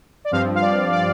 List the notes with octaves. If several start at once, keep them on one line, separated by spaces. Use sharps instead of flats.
D5
G2 F3 C4 F5
F5
D5
D5